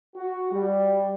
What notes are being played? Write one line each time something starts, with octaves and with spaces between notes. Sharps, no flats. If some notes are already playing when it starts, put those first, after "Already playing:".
F#4
G3